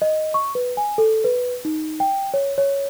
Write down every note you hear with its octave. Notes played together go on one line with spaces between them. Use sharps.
D#5
C#6
B4
G#5
A4
B4
D#4
G5
C#5
C#5